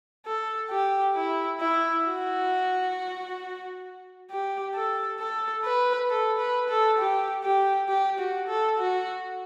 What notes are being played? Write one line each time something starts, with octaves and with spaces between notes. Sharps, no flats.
A4
G4
E4
E4
F#4
G4
A4
A4
B4
A4
B4
A4
G4
G4
G4
F#4
A4
F#4